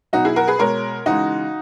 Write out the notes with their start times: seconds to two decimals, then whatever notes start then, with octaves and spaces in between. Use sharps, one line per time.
0.13 B2 F#3 D#4 F#4
0.25 E4 G#4
0.36 F#4 A#4
0.47 G#4 B4
0.59 B2 G#3 A#4 C#5
1.06 C#3 E3 G#3 D#4 F#4